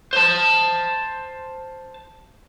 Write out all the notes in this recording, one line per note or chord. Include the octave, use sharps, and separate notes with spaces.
C5 A5